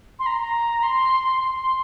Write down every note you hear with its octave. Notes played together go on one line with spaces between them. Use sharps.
C6
A#5
A#5
C6
C6
C6